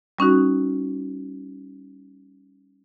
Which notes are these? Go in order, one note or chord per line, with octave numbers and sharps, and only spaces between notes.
G3 C#4 D#4 F#4